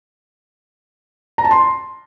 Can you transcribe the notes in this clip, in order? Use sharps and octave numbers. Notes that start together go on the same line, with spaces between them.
A#5
A5
C6